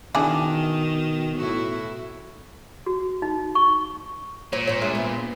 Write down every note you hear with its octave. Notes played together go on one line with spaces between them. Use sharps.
B2 D#3 D4 E4 G#4
A2 E4 F#4
F#4
D#4
C#6
A#2 C#5
C5 C#5
G#3 D4 E5
B3